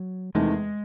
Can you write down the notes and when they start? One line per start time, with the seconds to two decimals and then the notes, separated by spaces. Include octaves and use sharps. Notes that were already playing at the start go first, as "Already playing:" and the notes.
Already playing: F#3
0.35 E2 C3 D#3 G#3 A3